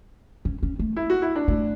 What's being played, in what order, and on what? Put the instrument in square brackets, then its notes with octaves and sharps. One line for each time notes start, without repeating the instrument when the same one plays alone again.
[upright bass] C#4
C#4
A3
[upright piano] E4
F#4
E4
D4
[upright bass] A3